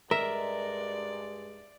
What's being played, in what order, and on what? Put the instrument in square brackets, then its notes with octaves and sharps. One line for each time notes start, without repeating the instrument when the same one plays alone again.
[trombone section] G2 G#3 [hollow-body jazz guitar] A#4 [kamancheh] D5 [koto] E5